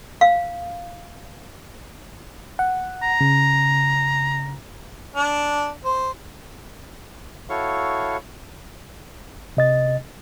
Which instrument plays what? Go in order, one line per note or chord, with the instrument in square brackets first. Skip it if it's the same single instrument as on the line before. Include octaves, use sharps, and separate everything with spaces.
[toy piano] F5
[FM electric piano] F#5
[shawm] A#5
[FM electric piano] C#3
[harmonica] D4
C5
[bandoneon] E4 F#4 A4 C#5 F5 C#6
[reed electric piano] C3 D#5 A6